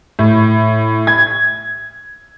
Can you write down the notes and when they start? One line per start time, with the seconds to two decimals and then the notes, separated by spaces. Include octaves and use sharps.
0.19 A2
1.07 G#6